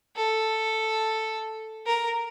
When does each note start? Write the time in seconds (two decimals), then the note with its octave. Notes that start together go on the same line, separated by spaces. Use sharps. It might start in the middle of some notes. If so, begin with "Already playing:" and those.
0.17 A4
1.86 A#4